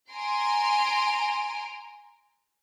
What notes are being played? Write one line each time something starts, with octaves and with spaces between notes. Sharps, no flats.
G#5 A#5 C6 D7